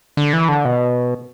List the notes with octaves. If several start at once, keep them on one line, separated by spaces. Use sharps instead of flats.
D3
E3
D3
B2